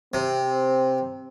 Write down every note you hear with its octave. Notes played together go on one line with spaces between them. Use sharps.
C3 C4